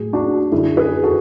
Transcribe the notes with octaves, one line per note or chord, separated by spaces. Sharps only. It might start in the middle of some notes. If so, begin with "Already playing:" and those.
Already playing: A2 F#3 G#4
D4 F#4
F#2 D3 F#3 E4 G#4
G#4 B4
F#4 A4